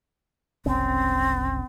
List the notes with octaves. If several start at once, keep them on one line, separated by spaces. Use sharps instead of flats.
F#1 C2 C4 C#4